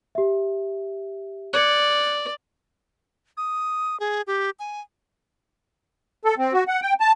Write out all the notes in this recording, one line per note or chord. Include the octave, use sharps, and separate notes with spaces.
G4 E5
D5 F#6 G#6 C#7
D#6
G#4
G4
G#5
A4
C4
F#4
F#5
G5
A5